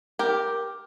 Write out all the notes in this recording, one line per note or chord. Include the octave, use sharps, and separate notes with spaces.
G4 A#4